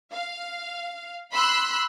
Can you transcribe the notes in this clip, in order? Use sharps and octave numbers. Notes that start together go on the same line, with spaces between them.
F5
B5 C6 E6 F#6